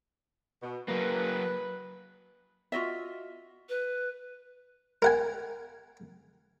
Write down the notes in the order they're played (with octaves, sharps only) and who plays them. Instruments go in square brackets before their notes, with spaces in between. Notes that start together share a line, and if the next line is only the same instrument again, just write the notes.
[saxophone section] B2
[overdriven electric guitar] F#3 A#3 [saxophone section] B4
[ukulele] F4 F#4 D#5 E5
[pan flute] B4
[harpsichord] A#4 F#5 G#5